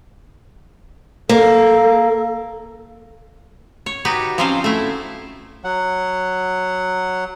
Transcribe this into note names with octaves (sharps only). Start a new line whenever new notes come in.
A#3 A4
C#5
D#4 F#4 G4 B4
F3 F#3 C4 C#4 C5 F5
A3 E4
F#3 F#5